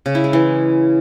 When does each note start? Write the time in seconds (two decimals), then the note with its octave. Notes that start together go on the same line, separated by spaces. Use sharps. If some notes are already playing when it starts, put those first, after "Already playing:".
0.06 C#3
0.15 E4
0.24 G#3
0.33 E3